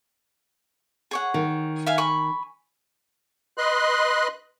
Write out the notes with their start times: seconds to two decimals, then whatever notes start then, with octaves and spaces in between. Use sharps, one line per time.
1.11 G#4 C#5 F#5
1.34 D#3
1.86 E5 F5 G#5
1.98 G#5 B5 C#6
3.57 B4 D#5 C6 F#6